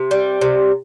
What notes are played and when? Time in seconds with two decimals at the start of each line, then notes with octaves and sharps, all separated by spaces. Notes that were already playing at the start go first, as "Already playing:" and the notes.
Already playing: C3
0.11 G3
0.41 C3